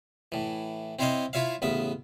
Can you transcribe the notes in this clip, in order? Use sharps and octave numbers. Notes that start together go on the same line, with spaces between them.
A2 E3
C4 E4 C5 C#5 D#5 F5
E4 F4 C#5 E5 F5
A1 C#3 B3 E5